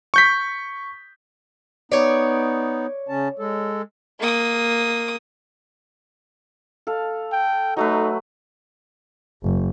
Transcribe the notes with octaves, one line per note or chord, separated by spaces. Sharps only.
C#6 G6 B6
B3 D#4 C#5 D5
C#3 C#4 A5
G#3 A4
A#3 D#6
A4 F5
G5
F#3 A3 D#4 B4
F#1